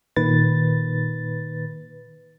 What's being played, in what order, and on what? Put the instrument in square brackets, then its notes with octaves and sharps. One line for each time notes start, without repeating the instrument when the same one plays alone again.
[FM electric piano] A#2 D#3 B4 A6